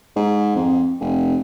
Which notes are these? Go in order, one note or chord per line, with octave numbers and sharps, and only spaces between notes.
G#2
F2
F1